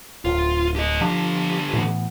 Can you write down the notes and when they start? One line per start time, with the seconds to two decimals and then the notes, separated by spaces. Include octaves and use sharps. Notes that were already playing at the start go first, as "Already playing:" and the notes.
0.25 D1 F4
0.76 G4 D#5
1.01 D3 F3 D4 G4
1.73 A2 E3 B3